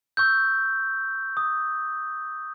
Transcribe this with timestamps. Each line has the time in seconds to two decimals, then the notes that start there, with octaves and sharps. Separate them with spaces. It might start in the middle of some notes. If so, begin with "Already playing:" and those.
0.17 C#6 E6 G6
1.37 D#6